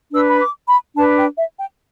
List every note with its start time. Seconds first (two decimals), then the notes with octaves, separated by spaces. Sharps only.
0.12 D4 B4 E6
0.27 B5
0.40 D6
0.67 B5
0.95 D4 B4 A5
1.17 G5
1.38 E5
1.59 G5